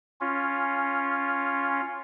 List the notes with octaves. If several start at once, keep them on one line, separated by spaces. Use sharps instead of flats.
C#4 F4